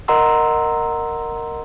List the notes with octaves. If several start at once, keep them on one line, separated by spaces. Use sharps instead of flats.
A#4 D#5 F#5 A#5 C6 E6